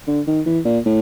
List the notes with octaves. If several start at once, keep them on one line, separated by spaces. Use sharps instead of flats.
D3
D#3
E3
A#2
A2